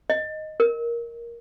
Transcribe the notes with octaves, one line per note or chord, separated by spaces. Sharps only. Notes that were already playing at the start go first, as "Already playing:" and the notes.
D#5
A#4